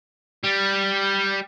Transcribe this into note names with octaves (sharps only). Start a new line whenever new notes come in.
G3